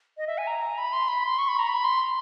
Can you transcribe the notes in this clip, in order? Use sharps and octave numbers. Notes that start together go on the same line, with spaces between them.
D#5
E5
G#5
A#5
B5
C6
B5
C6
C#6
B5
A#5
B5
C6